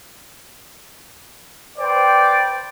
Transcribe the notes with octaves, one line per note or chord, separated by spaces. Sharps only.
B4 C5 D5 G5